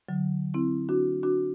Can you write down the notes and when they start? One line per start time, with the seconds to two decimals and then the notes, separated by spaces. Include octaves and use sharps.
0.09 D3 F#3
0.54 C4 E4
0.89 D4 F#4
1.23 D4 F#4